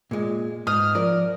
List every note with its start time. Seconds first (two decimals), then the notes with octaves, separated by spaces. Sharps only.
0.11 A#2 G#3
0.67 G#2 D#6 F6
0.95 F3 A#4 D5